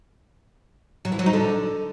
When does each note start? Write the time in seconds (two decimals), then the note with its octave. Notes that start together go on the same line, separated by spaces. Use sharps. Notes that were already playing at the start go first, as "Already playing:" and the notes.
1.05 F#3
1.12 E3
1.19 F#3
1.26 D#4
1.33 D3